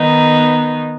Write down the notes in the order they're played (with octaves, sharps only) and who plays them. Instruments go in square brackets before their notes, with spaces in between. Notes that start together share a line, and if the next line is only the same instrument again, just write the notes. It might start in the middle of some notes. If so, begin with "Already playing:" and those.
Already playing: [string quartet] D#3 B3 D#4